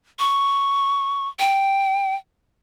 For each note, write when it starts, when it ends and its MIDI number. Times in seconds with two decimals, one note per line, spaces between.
0.19 1.28 85
1.39 2.15 79